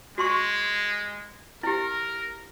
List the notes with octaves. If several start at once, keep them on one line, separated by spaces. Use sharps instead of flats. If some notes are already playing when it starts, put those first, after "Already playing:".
G#3 F#4 C6 C#6
E4 G4 A#4